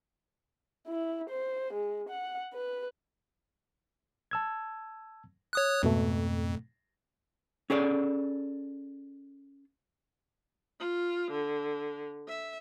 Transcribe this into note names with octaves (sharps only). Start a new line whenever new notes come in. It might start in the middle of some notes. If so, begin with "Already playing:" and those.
E4
C5
G#3
F#5
B4
A5 E6 G#6
C#5 D#6 F#6
F2 G#2 B2 A3
C#4 G#4 A4 D5
F4
D3
E5